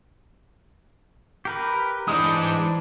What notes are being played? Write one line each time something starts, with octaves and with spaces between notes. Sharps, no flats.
G4 A#4 B4
E3 G#3 D4 C5 D#6